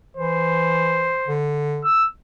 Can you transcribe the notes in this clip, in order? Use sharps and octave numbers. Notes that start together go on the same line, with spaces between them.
E3 C5
D3
E6